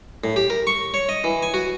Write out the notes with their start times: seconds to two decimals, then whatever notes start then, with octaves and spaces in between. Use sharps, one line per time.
0.24 A2
0.36 G4
0.50 A#4
0.67 C#6
0.94 C#5
1.09 D#5
1.24 E3
1.42 G#5
1.54 F#4